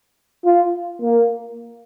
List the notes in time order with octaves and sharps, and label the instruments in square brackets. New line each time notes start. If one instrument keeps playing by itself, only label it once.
[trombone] F4
A#3